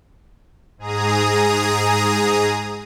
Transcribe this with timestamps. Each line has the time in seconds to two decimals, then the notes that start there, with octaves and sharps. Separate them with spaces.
0.78 G#2 G#4 A#5 D#6